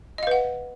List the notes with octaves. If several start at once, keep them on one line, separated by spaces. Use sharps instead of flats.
B4 D#5 F5 F#5